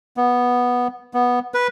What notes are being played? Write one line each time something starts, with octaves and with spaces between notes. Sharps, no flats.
B3
B3
B4